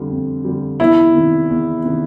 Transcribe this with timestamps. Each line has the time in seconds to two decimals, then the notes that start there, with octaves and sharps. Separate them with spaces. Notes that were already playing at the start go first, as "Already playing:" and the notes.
Already playing: F2 D3 G3
0.11 F2
0.44 D3 G3
0.79 E2 E4
1.14 C3 D#3
1.49 E2
1.83 C3 D#3